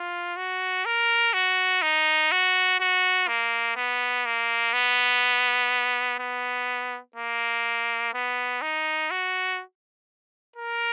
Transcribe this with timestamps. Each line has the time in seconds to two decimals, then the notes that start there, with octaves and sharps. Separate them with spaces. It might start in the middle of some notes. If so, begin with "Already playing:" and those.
Already playing: F4
0.36 F#4
0.85 A#4
1.33 F#4
1.82 D#4
2.31 F#4
2.80 F#4
3.28 A#3
3.76 B3
4.26 A#3
4.73 B3
6.19 B3
7.16 A#3
8.14 B3
8.62 D#4
9.11 F#4
10.56 A#4